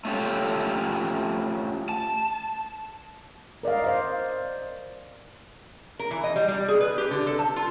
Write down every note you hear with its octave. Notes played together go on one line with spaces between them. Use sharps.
A3 C#4 F4 G4 A4
A5
A#4 D5 D#5 F5
C5 F5
A#4
E3
D#5
G3
G3
G#4
B4
G4
D3
A4
A5
F4